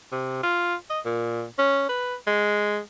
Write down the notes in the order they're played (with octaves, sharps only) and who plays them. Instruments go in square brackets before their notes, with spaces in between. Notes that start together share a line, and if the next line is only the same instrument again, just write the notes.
[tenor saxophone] C3
F4
D#5
A#2
C#4
B4
G#3